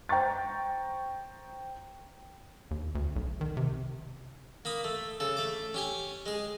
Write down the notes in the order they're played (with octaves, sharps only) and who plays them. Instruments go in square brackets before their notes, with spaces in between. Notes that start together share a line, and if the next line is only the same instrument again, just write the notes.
[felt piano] C5 G5 A#5 C#6 A6
[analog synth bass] D#2
D2
B1
D#3
C3
[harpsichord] A#3 B5 D#6
A3
C#3 A4
A3 D6
C#4 G4 G#5
G#3 G#4